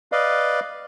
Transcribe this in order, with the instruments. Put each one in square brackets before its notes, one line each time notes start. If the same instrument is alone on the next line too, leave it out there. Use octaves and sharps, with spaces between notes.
[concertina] B4 D5 D#5 F5